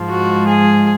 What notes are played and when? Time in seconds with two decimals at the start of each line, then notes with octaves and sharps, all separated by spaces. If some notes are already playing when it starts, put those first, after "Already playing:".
Already playing: G#2 F3 G#3
0.09 F#4
0.48 G#4